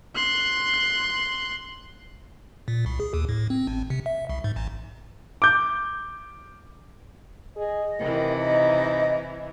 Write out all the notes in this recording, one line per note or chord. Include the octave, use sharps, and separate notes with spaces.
C6 F#6
A#2
C2
G#4
D#2
A2
C4
G#1
C3
E5
C2
G#2
A1
D6 G6
G#4 D#5
C3 D#3 E3
D#4 D#5